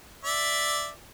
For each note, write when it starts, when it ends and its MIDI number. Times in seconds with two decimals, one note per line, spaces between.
0.24 0.90 74
0.24 0.90 76